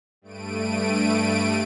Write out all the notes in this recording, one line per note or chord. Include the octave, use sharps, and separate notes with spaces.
G2 A3 D7 D#7